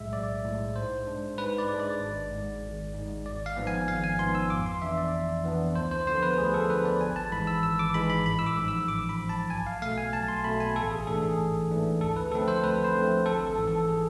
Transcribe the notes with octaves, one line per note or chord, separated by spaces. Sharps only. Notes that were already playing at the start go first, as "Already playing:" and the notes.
Already playing: B1 A2 G#3 E5
B1 D5
A2 G#3
G#2 C5
G#3 D4
G#2 B4
D5
G#3 D4
D5
G#1
G#2 G#3
G#1
G#2 G#3
G#1 D5
F5
G#2 F3 B3
G#5
G#1 F5
G#5
G#2 F3 B3 C6
E6
F2 D6
C6
E3 B3 D4 E5
D5
F2
E3 B3 D4
D2 C5
C5
D3 F3 B3 C5
B4
D2 G#4
A4
D3 F3 B3 B4
D5
G#1 G#5
A5
G#2 E3 G#3 B5
E6
G#1 E6
D6
G#2 E3 G#3 B5
B5
A1 B5
E6
D6
G#2 F3
E6
A1 D6
B5
G#2 F3
A5
B1 G#5
F5
B2 A3 F5
G#5
B1 A5
C6
B2 A3 B5
G#5
A1 A4
G#4
G#2 E3 A3 D4 A4
G#4
A1
G#2 E3 A3 D4
D2 A4
B4
D3 F3 A3 C4 A4
C5
D2 B4
C5
D3 F3 A3 C4
G#1 A4
A4
G#2 E3
A4
G#4